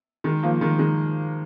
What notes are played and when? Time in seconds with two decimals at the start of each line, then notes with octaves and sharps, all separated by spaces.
0.24 D#3 G#3
0.43 F3 A#3
0.61 D#3 G#3
0.79 D#3 G#3